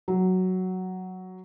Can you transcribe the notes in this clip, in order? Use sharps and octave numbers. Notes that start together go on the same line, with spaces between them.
F#3